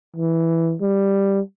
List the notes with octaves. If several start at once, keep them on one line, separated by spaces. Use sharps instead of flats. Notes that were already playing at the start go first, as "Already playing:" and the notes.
E3
G3